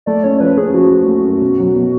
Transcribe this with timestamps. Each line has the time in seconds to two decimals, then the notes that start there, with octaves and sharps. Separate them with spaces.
0.06 A3 D5
0.23 C#4 C#5
0.40 F3 B4
0.57 C#4 G#4
0.74 F3 F#4
0.91 A3
1.08 A3
1.24 F#2
1.41 B2
1.59 F#3
1.75 B2